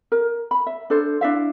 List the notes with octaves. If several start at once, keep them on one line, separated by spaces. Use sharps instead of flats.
A#4
B5
E5
D4 A4 C5
D4 E4 E5 F5